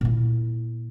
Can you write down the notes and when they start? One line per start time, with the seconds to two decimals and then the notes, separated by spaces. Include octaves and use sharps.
0.01 A#2 E4